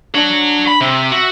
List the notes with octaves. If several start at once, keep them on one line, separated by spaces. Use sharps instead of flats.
D4 C#5 F#5
B5
C3 E5
F#4 E5